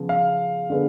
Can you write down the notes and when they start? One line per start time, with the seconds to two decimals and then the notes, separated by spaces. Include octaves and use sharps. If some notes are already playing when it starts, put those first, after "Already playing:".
Already playing: C#3 F3 B3
0.09 F5
0.70 D3 G#3 B3